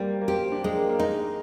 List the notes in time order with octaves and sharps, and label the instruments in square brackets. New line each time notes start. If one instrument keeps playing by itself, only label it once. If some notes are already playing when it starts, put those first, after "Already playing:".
Already playing: [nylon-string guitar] G3 [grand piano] A#3 C4
[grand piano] A#3
[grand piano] C4 [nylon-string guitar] G4
[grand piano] D4
[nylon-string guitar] G#3
[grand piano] A#3
A#3
[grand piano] G#3 [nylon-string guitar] D#4